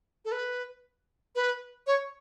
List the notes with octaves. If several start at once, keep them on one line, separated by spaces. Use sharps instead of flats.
A4
B4
B4
C#5